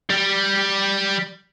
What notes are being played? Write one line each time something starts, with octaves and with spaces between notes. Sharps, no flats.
G3